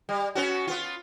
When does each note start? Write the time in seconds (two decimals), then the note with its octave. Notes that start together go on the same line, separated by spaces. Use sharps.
0.09 G3
0.35 B3 C#4 F#4
0.67 B3 F4